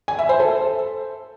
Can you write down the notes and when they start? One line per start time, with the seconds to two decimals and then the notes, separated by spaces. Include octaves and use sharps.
0.08 G#5
0.19 E5
0.29 C5
0.40 A4